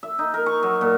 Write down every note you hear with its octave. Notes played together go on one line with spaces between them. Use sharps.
E5
D#4
A#4
C#6
F#3
A#2